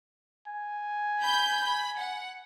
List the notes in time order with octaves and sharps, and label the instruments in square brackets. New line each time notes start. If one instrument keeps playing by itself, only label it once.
[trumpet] G#5
[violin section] B5 G6
B5
F#5